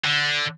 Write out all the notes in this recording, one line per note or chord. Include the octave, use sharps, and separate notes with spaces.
D3